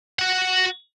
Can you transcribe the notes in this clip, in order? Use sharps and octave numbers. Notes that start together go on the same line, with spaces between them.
F#4 F#5